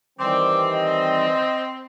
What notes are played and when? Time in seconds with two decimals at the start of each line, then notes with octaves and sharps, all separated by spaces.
0.19 D#3 E3 G3 C4 D6
0.73 D#5